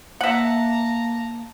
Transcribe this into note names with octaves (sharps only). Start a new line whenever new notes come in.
A#3 E5 F#5 A5 A#5